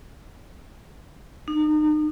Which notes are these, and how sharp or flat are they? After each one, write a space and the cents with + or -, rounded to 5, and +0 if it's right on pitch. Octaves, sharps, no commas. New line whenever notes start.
D#4 -35